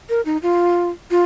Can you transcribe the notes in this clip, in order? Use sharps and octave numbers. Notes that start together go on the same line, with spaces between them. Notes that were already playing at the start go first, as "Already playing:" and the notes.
A#4
D#4
F4
F4